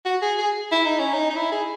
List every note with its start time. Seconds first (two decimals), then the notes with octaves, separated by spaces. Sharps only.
0.06 F#4
0.22 G#4
0.38 G#4
0.72 E4
0.85 D#4
0.99 C#4
1.13 D#4
1.30 D#4
1.36 E4
1.52 G#4